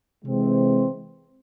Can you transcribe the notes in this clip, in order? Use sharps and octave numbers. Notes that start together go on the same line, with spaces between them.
C3 E3 G#3 C4